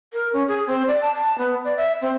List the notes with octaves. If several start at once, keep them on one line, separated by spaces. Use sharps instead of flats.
A#4
C#4
G#4
C4
D5
A5
A5
B3
D5
E5
C4